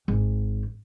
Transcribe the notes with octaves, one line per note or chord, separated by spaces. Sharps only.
G#1